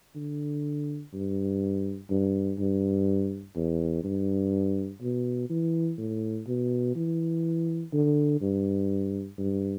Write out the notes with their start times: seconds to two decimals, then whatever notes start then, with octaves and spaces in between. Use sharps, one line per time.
0.16 D3
1.14 G2
2.10 G2
2.59 G2
3.56 E2
4.04 G2
5.01 B2
5.50 E3
5.99 A2
6.47 B2
6.96 E3
7.93 D3
8.41 G2
9.39 G2